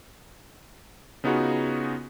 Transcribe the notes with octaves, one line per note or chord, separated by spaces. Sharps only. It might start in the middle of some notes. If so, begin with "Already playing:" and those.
C#3 B3 D#4 F4 F#4 G#4